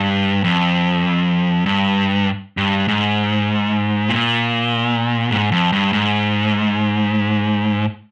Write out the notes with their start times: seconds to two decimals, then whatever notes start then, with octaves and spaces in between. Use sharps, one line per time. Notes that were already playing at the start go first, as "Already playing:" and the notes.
Already playing: G2
0.44 F2
1.66 G2
2.57 G2
2.88 G#2
4.09 A#2
5.31 G#2
5.52 F2
5.72 G2
5.93 G#2